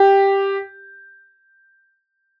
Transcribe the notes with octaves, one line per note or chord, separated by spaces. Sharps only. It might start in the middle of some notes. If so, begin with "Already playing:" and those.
Already playing: G4